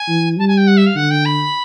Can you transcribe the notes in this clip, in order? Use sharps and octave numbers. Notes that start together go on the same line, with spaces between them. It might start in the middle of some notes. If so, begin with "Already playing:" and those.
Already playing: G#5
E3
G3 A5
G#5
G5
F#5
E5
F5
D3 F#5
G5
B5